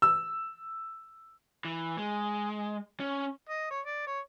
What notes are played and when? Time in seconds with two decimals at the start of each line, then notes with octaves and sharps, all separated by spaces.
0.02 E6
1.65 E3
1.98 G#3
3.00 C#4
3.49 D#5
3.70 C#5
3.85 D5
4.07 C#5